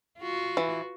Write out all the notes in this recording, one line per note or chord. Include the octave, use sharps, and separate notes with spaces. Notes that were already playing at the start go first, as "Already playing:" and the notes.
F4 F#4
E3